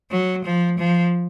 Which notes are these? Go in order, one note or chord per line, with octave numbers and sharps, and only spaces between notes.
F#3
F3
F3